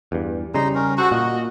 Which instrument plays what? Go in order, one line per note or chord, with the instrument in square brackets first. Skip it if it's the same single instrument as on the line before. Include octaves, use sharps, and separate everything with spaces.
[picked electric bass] E2 G2
[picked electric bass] C#3 G3 [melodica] D#4 A#5 C6
[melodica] C#4 A#4
[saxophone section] F#4 [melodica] A4 C5
[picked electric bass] A#2 [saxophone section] F#4 [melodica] D#5